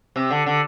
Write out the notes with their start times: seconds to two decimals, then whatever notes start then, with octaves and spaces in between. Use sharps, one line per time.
0.16 C3
0.31 D3
0.46 D3